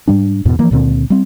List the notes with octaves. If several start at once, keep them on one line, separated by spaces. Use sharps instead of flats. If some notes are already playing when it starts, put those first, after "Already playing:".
G#2 G3 D4
E2 G#2 B2
E3 F3 A#3
C#2 A#2 D3 C4
G3 C4